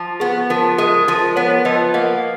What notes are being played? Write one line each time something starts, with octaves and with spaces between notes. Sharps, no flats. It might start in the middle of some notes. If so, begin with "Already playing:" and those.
Already playing: F3
B3 G#4
F3 A#4
G#3 A#4
F3 A#4
B3 A#4 C#5
F3 B4 D#5
A#3 D#5 F#5